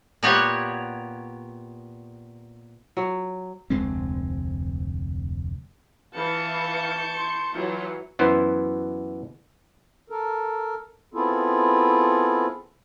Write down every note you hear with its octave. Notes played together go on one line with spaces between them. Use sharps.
A#2 B3 F#4 G4 C#5
F#3
F1 D2 G#3 C4
E3 F5 A5 C#6 G6 C#7
C6
E3 F#3 F4
F#2 E3 B3 E4 C5
A4 A#4
B3 C4 E4 F4 G#4 A4